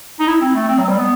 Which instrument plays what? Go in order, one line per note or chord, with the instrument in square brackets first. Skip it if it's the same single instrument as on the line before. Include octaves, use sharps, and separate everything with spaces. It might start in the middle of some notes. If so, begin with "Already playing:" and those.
[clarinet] D#4
E4
C4
A3
C4
F#3
G3
B3